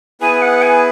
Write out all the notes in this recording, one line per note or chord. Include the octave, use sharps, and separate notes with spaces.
B3 E4 G#4 B4 G#5
F#5
G#5